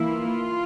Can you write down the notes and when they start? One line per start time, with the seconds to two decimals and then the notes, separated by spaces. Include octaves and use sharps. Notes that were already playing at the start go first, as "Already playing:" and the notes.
Already playing: E3 A#3 E4
0.10 F4